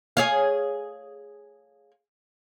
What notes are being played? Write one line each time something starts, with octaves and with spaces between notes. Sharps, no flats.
G#4 C#5 F5